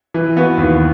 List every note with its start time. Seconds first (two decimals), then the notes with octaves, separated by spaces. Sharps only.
0.14 E3
0.37 B3 F#4
0.58 D#2